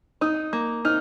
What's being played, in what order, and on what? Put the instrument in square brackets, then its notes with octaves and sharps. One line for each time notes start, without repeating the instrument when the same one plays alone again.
[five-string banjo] D#4 [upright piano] D#6
[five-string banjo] A#3
[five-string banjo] D#4 [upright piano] F6